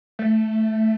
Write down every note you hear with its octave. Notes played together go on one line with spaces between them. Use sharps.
A3